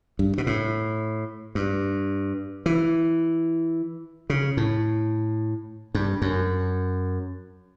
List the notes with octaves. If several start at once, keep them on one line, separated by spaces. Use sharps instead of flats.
G2
B2
A2
G2
E3
C#3
A2
G2
F#2